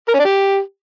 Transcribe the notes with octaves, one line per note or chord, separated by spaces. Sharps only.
A#4
C#4
D4
G4